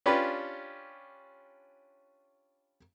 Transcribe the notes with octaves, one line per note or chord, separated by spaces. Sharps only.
C#4 D4 F4 G4 B4